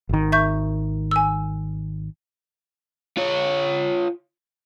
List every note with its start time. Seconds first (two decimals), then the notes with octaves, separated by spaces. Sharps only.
0.09 G#1 D#3
0.32 E5 C#6 G6
1.11 G#5 E6
3.17 F4 C#5